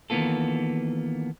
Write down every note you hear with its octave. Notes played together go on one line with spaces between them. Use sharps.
D#3 E3 A#3 B3 F4 A4